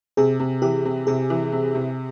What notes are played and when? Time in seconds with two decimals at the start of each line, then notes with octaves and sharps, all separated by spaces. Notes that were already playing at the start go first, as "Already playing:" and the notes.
0.17 C3 G#4
0.40 C3
0.62 E3 G4
0.85 C3
1.07 C3 G#4
1.30 E3
1.52 C3
1.75 C3